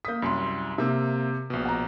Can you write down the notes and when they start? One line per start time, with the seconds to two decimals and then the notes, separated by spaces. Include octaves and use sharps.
0.05 A#3 D#6 G6 B6
0.22 C2 F#2 B5 C6
0.78 C3 A#3 C4 E5
1.50 A#1 B2
1.65 F#5 A#5